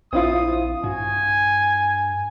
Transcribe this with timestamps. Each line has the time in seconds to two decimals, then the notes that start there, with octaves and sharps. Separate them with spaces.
0.13 A#1 C4 E4 F4 D#6
0.84 G2 F#4 G#5